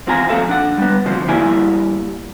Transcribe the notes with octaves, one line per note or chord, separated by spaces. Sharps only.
E2 C4 F4 F5 G#5 A#5
F2 A#2 A#3 A4 E5 F5
D4 F#5
G3 B3
D2 C3 F3 C4
E2 E3 G3 A#3 E4 G#5